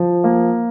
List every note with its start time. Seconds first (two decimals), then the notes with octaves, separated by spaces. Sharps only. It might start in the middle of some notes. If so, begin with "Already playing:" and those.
Already playing: F3
0.24 A#3